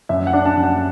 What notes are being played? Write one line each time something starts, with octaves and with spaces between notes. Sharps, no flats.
F#2 E5
F#5
D4
A5
F#2
F#5